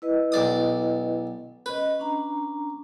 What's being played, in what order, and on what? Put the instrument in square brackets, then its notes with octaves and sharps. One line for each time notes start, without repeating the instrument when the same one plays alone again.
[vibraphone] E4 B4 D#5
[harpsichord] B1 D5 D#6
[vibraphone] C#4 D#5 [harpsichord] B4
[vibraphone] C#4 D4 A#5